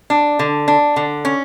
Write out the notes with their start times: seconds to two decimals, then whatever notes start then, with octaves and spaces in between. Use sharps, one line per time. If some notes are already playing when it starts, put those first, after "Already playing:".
0.10 D4
0.39 D3
0.68 D4
0.96 D3
1.25 C#4